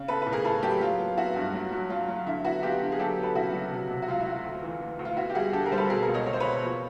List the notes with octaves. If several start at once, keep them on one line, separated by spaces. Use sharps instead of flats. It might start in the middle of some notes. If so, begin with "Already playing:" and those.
Already playing: C#3
B3 A4 B4
A2 B4
G#4 A#4
A2 A4 B4
F#3 G4 A4
F#3 F4
B3
B3 E4 F#4
G2
F#3
F#3
F#3 F4
F#3
D3 E4
B3 E4 F#4
B3 F4 G4
D3
G#4
F#3 G4 A4
B3
A4 B4
C#3 E4 F#4
F#3
C3
C3
F#4
C#2 F4
E4
C#2
F4
D2
E3
E3
D2
F4
B3 E4 F#4
G4
G3 F#4 G#4
D3 G4 A4
G#4 A#4
G3 C5
A4 B4
B2 G#4 A#4
A4
G#4 A#4
C#2
C#5 D#5
C#2 C#5
C5
B2 B4 C#5
F3